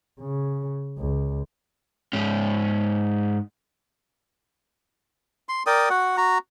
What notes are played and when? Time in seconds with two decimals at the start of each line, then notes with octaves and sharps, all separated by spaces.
0.20 C#3
0.98 C#2
2.13 G#2 C#4
5.49 C6
5.66 A#4 D5 G5 D#6
5.90 F#4 F#5
6.17 F#4 A#5